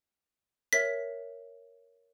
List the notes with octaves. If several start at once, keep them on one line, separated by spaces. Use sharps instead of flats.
A#4 C#5 E5 B6